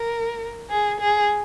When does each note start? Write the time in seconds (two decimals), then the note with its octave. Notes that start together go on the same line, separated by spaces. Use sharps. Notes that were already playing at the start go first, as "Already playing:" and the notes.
Already playing: A#4
0.70 G#4
1.00 G#4